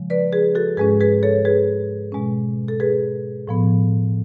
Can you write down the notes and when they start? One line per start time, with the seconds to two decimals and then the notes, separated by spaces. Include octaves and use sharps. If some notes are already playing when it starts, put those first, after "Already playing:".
Already playing: C#3 F3 G#3
0.10 B4 D5
0.33 G#4 B4
0.55 F#4 A4
0.77 G#2 G#3 C#4 G#4 B4
1.01 G#4 B4
1.23 A4 C#5
1.45 G#4 B4
2.12 B2 G#3 C#4
2.68 A4
2.80 G#4 B4
3.47 A2 F3 B3